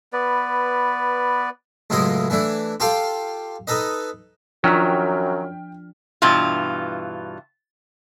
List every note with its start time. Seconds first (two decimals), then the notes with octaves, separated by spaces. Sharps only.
0.13 B3 B4 D5
1.90 C#2 F#2 A2 E4 F4 D#5
2.30 E3 A3 D4 E4
2.80 F4 G4 A4 F5 G5
3.67 D#4 A4 B4 D#5
4.64 F#2 D#3 F3 F#3 D4 G5 F6 B6
6.22 G2 B2 E3 F4